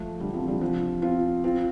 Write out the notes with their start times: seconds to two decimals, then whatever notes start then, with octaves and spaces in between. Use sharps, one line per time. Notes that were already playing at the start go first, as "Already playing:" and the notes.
Already playing: F3 A3
0.20 D3 G3
0.33 C3 F3
0.48 D3 G3
0.61 C3 F3
1.02 C4 F4
1.44 C4 F4